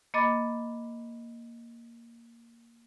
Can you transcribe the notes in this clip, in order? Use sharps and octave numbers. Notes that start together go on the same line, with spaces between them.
A#3 D#5 B5 D6 A6